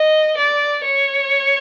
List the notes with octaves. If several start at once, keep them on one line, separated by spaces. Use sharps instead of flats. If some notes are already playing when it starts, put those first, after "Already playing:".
Already playing: D#5
D5
C#5